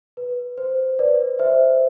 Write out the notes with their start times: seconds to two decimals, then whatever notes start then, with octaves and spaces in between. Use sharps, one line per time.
0.17 B4
0.58 C5
0.99 B4 D5
1.39 C5 E5